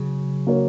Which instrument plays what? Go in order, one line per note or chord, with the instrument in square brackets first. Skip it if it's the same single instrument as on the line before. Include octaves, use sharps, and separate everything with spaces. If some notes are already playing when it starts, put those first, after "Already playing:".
Already playing: [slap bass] C#3 F#3
[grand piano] A#3 F#4 A#4 C#5